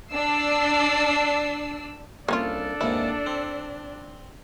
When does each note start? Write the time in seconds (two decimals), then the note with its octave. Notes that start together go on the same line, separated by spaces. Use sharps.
0.12 D4 D5 E6 C7
2.29 C2 A#3 C#4 D4 F4 A4
2.81 D#2 G#2 C3 E4
3.26 C4